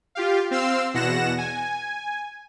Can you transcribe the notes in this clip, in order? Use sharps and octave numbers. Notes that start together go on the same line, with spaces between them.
F4 G4 F5
C4 F5 C6 E6
E2 B2 F#5 A#6 E7
G#5